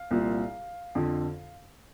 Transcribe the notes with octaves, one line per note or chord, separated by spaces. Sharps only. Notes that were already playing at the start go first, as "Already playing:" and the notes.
Already playing: F5
C2 A#2 F3
F2 D3 F3